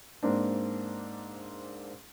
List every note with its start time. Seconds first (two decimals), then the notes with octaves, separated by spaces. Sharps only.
0.23 G#2 A#3 C4 D4